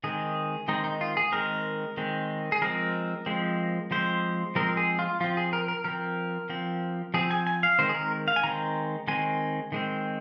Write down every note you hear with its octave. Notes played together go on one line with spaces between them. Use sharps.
D#3 G#3 C4 G#4
D#3 G#3 C4 D#4
D#4
F4
G#4
D#3 G#3 C4 A#4
D#3 G#3 C4
G#4
F3 G#3 C4 A#4
F3 G#3 C4
F3 G#3 C4 C5
F3 G#3 C4 A#4
G#4
F4
F3 C4 F4
G#4
A#4
A#4
F3 C4 A#4
F3 C4
F3 C4 G#4
G#5
G#5
F5
D#3 G#3 C4 C5
G#4
A#4
F5
G#5
D#3 G#3 C4 A#5
D#3 G#3 C4 G#5
D#3 G#3 C4